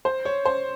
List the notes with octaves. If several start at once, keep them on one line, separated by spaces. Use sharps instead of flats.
C5
C#5
C5